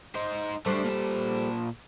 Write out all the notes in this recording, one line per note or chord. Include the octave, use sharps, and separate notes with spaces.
D#4 C5
G3 A3 D4 A4 C5
A#2 A5